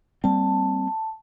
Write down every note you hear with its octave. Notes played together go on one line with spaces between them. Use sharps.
G3 A#3 C4 A5